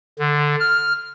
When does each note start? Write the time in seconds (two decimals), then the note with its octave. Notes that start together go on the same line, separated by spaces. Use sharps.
0.19 D3
0.60 F6